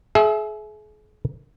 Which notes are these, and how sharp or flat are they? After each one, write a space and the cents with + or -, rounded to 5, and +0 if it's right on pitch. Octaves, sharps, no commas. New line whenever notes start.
G#4 +40 E5 +0